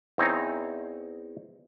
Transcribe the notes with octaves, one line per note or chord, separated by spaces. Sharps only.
E2 C4 D#4 C#5 A#5